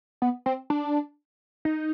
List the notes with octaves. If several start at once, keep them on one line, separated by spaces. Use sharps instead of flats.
B3
C4
D4
D#4